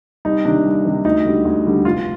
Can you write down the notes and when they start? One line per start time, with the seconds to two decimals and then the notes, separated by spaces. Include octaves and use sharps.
0.25 C2 D#4
0.45 C3 D#3 D4
0.65 C2
0.85 C3 D#3
1.05 D2 D#4
1.24 D3 G3
1.45 D2
1.66 D3 G3
1.85 F1 F4